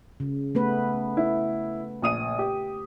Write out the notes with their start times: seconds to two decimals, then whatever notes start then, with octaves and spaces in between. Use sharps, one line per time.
0.20 C#3
0.55 A3 B3 B4
1.17 E4
2.02 A#1 D#6 D#7
2.39 G4